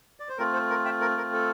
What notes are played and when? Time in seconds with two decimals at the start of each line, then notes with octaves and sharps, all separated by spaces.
0.20 D5
0.29 C5
0.38 A3 C4 F4 A#4
0.53 A4 C5
0.70 A#4
0.85 E5 G5
1.01 A#4
1.17 A#4
1.33 A4